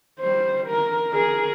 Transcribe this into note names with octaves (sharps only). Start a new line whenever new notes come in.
G3 C5
A#4
G#4 A#4